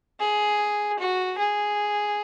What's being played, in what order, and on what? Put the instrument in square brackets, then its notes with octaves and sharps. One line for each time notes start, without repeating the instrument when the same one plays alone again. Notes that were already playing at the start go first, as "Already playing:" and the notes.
[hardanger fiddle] G#4
F#4
G#4